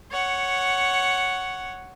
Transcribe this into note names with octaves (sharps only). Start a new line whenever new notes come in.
C#5 F#5